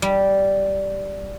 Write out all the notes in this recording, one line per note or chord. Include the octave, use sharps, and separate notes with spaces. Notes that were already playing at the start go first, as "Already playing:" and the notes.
G3